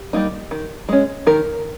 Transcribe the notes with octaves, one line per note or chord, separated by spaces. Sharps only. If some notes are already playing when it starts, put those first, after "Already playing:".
Already playing: G4
G3 A#3 D#4
D#3
G#3 C#4
D#3 A#4